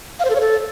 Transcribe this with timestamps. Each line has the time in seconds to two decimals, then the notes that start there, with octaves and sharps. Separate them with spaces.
0.20 F5
0.25 C5
0.30 A4
0.35 C#5
0.40 A4